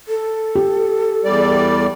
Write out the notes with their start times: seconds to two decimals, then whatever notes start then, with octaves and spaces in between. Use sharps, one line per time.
0.08 A4
0.55 G4
1.24 E2 G3 D5